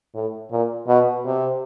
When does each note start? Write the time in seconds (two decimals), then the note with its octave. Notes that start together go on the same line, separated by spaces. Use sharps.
0.14 A2
0.51 A#2
0.88 B2
1.25 C3